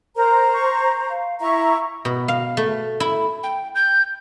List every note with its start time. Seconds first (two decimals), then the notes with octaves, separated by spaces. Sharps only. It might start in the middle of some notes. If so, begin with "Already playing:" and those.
0.16 A#4 C5 A#5
0.53 C#6
1.10 F5
1.40 E4 E5 A#5 C#6
2.05 B2
2.28 F5
2.57 A3
3.00 E4
3.43 G5
3.75 G6